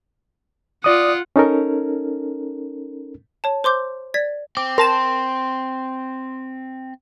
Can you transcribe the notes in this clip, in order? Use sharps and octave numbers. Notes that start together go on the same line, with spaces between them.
F4 D5 F#5 D#6
C#4 D#4 A4 A#4
C#5 A5
C5 C6 D6 G6
D5 G#6 B6
C4 D6
A#4 A5 C6 E7